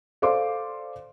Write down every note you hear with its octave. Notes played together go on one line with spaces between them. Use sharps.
A4 C5 D5 F5 C6 D6